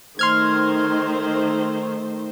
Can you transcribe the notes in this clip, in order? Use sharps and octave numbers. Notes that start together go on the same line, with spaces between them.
D#3 A3 C5 C6 F6 G#6